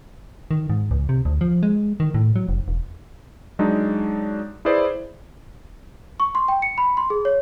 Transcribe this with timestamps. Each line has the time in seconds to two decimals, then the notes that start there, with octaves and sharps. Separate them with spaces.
0.51 D#3
0.70 G#2
0.91 C#2
1.09 C3
1.25 D2
1.41 F3
1.63 G#3
2.00 D#3
2.14 A2
2.36 F#3
2.49 F1
2.68 E1
3.59 F#3 G#3 D4 D#4
4.65 E4 G#4 B4 C5 D5
6.20 C#6
6.35 C6
6.48 G5
6.62 C#7
6.78 B5
6.97 C6
7.10 G#4
7.25 C#5